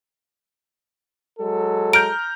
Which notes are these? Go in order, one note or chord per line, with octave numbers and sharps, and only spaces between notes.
F#3 G#3 A4
A#5 F6 G6 D7